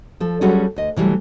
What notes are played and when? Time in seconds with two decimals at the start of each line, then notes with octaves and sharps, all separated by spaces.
0.20 F3 A4
0.41 F#3 G3 C#4 F#4 G#4 A4
0.76 D2 D#5
0.96 C3 E3 F#3 G3 A3